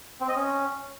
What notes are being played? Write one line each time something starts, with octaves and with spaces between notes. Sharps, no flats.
C4
D#5
C#4